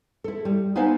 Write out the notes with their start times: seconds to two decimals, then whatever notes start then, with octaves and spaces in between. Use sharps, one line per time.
0.24 E4 A4
0.45 G3
0.76 B3 D#4 E4 C5 F5 G#5